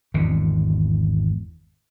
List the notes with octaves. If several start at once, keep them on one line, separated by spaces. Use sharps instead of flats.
G#1 E2 B2 D3